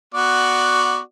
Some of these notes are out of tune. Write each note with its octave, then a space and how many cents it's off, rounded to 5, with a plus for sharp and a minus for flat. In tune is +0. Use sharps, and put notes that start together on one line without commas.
B3 +0 F#4 +0 D5 +0